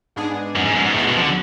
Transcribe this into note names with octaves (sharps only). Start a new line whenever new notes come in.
G#2 G#3 B3 D4 G#4
F#2
G#2
F#2
G#2
D2 A2 C#3 G#3 B3 F#4
B2
F3
D3